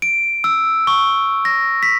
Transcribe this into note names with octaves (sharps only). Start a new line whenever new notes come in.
D7
E6
C#6
A#6
B6